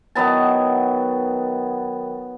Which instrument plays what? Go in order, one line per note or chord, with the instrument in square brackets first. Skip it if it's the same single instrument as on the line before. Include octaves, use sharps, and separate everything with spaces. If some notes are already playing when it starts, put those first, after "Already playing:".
[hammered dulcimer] D#3 F#3 B3 A5